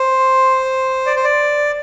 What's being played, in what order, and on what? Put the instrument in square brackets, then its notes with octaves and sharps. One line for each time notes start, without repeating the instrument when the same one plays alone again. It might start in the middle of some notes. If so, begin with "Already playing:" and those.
Already playing: [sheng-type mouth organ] C5
D5
C5
D5